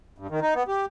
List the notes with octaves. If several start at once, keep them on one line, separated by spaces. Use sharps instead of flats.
G2
D#3
D#4
B3
G4